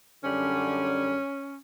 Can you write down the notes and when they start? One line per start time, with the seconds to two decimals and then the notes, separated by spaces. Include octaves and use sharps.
0.23 F#2 D3 G3 C#4